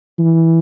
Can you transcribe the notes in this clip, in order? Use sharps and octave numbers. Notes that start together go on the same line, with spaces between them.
E3